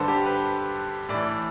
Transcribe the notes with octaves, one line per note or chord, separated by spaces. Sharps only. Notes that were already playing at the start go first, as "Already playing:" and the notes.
Already playing: G2 D3 A4 B4 C5
G4
B4
A2 E3 D5